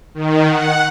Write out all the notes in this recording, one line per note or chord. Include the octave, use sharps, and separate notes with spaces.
D#3
F#5